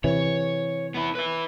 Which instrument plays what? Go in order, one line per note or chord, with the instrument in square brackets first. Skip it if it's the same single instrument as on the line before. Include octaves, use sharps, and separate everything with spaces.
[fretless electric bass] C3 E3 [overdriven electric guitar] C#5
[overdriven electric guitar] B3 E4
B4 E5